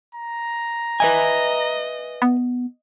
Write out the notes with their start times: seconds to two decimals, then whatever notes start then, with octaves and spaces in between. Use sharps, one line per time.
0.15 A#5
1.00 B4 D#5 E5 G#5
2.22 B3